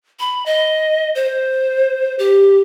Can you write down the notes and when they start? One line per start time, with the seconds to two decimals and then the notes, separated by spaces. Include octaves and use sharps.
0.20 B5
0.46 D#5
1.15 C5
2.19 G4